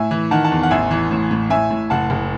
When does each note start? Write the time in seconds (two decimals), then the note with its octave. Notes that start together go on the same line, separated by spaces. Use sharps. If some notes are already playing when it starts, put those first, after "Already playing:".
Already playing: A2 E5 G#5
0.11 E3
0.31 D#3 F#5 A5
0.44 F#5 A5
0.51 E2
0.63 F#5
0.71 A1 E5 G#5
0.91 E3
1.11 A2
1.31 A2
1.50 A2 E5 G#5
1.71 A2
1.90 F#1 F#5 A5
2.10 F#1